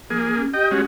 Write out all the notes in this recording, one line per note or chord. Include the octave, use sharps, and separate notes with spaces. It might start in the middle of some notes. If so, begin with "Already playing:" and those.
F3 A#3 G#4
C#4
G4 D#5 G5
G#3 C#4 F#4